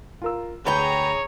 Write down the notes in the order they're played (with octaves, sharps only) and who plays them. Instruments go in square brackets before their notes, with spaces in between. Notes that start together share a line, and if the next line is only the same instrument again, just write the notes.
[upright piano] F4 A#4 E6
[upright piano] D2 [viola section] G#4 A#5 [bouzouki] B4 G5 [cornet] C#5